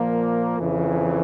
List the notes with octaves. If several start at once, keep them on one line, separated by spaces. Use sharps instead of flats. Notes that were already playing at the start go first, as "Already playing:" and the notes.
Already playing: A#2 F3 A#3
F2 C#3 E3